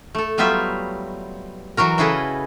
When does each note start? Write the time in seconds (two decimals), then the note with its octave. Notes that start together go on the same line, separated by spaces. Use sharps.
0.15 A3 A4
0.38 F#3 G3 B3 F4 G4 E5
1.77 E3 F#3 F#4 A#4
1.98 C#3 E4 G#4 A4 B4 D#5